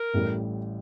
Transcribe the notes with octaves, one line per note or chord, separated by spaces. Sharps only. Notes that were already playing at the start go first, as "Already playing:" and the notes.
Already playing: A#4
A1 A2 G3